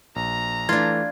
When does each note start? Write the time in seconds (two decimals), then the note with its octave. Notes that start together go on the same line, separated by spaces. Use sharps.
0.16 A#1 A#5
0.69 E3 A3 D4 F4 G#6